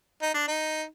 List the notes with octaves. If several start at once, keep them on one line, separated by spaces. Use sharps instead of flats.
D#4
D4
D#4